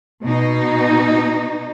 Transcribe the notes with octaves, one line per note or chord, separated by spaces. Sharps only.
B2 D#4